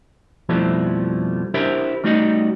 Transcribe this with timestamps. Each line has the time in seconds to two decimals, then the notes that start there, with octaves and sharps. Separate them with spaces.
0.49 F2 B2 F3 G3 A3 E4
1.54 D4 E4 G4 A#4 C5 E5
2.04 G3 A3 D#4 F#4 D#5